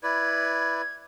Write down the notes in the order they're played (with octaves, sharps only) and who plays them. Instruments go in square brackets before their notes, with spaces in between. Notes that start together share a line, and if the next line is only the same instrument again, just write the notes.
[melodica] E4 B4 D5 [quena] G#6